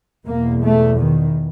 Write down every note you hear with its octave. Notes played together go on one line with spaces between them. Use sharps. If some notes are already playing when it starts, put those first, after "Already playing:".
E2 B2 A#3
A3
D#3